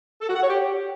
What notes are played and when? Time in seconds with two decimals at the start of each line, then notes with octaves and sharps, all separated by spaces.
0.21 A4
0.29 F#4
0.36 F#5
0.43 C#5
0.50 G4